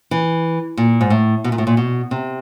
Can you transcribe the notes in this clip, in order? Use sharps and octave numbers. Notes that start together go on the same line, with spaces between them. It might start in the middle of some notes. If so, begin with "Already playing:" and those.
E3
A#2
G#2
A2
B2
A#2
A2
A#2
B2
C3